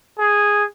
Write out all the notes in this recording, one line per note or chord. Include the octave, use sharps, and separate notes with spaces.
G#4